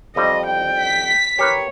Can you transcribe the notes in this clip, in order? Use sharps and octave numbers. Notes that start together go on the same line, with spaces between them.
F2 G3 C4 D#5
G5
B6
G4 A#4 B4 C#5